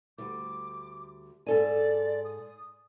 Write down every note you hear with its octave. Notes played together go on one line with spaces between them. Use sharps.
D2 G3 D6
G#2 A4 D5 G#5
D#6